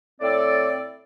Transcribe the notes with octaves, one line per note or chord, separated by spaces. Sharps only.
A2 C4 A4 D5